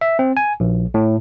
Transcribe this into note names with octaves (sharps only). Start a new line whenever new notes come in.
E5
C4
G#5
A#1
A2